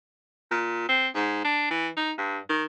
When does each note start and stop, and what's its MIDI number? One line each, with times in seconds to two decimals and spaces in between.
0.51 0.84 46
0.89 1.08 60
1.15 1.43 44
1.44 1.70 62
1.70 1.88 52
1.97 2.12 63
2.18 2.38 43
2.49 2.64 51